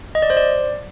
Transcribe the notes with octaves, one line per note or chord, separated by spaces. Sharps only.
D#5
D5
C5
D5